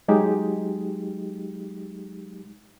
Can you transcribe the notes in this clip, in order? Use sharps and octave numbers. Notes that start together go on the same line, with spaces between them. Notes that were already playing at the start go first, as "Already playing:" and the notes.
F#3 G#3 D#4 G4